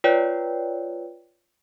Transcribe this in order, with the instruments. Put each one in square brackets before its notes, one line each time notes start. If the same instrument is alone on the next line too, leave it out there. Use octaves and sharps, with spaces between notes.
[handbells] F4 B4 C#5 D5 G5